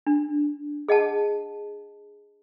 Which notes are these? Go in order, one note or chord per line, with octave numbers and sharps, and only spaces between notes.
D4
G#4 D#5 F#5 A5